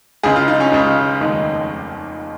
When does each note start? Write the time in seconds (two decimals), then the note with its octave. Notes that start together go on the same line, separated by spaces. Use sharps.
0.23 C#2 C#3 G#3 G#4
0.36 F4
0.48 D#4
0.60 C#4
0.72 C#2 C#3 G#3
1.21 F1 D#2 D#3 G#3